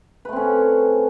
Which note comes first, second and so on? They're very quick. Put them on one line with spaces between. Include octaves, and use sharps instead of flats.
B4 A3 C4 C#4